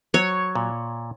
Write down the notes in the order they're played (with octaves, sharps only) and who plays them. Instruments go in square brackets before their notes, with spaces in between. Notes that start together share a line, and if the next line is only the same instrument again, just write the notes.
[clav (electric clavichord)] F#3 [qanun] C#5
[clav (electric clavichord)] A#2